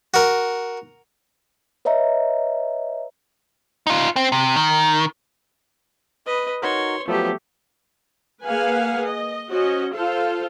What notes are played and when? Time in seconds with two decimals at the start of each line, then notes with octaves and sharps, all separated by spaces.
0.14 F#4 A#4
1.85 B4 C#5 D#5 E5 A#5
3.87 D#4 F4
4.16 C4
4.32 C3
4.56 D#3
6.25 B4 D#5
6.62 D#4 F#4 A#4 C#5 C6
7.08 F3 F#3 A3 B3 G4
8.45 A#3 G#4 B4 F5 F#5 G#5
9.08 D#5
9.49 C#4 F#4 C5 D#5
9.94 F4 A4 C5 F5